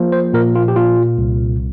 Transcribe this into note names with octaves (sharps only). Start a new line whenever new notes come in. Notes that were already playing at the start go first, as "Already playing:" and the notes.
Already playing: F3 A#3
C5
A#2 A#4
F4
G4
A#2 F4
C2